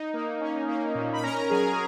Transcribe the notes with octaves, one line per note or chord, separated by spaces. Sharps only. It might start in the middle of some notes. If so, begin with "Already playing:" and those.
Already playing: D#4
A#3
C#4
A#3
A#2
B5
C#4 A#4 A#5
F#3 G#4 G#5